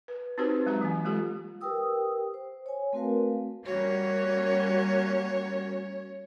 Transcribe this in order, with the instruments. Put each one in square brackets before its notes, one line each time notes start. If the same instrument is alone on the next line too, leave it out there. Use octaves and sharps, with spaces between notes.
[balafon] B4
C4 D#4 F#4 G4 B4 C5
F#3 G#3 F#4 E5 A#5
E3 A#3
G#3 F4 G4 A4
[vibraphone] G4 A#4 B4 G5 D#6 E6
C5
C#5 G#5
A3 C4 F#4 A#4 B4 F5
[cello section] G3 A#3 C#4 [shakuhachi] F#4 [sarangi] C#5